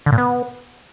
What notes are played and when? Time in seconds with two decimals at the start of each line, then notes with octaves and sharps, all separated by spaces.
0.06 D3
0.12 A#2
0.18 B3